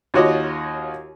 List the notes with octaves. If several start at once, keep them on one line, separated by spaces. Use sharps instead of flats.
D#2 F4 F#4 C#5 D#5 D6